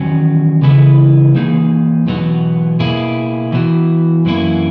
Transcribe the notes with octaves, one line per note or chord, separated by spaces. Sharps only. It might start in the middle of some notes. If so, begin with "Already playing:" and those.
Already playing: E2 D#3 F#3 C#4
C#3 E3 G#3 B3 E4
E3 A#3 D#4 G#4
E2 B2 F#3 B3
B2 A#3 E4 G#4
E3 B3 F#4
F#2 E3 A#3 C#4 E4